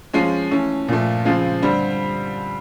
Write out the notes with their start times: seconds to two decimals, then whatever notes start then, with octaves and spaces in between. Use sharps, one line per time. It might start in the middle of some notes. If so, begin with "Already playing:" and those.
0.14 F3 G#3 C#4
0.51 E3 A3 C#4
0.88 A#2 F3 A3
1.25 C#3 F3 G#3 C4
1.62 D3 G3 C4